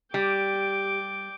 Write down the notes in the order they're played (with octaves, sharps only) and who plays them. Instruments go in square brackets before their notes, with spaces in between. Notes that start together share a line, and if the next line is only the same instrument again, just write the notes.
[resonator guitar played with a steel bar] G3 [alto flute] G4 [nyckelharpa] G5 D6